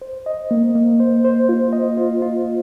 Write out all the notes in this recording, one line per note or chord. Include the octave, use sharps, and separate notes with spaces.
C5
D#5
A#3
A#3
C5
C5
F4
D#5
F4
F4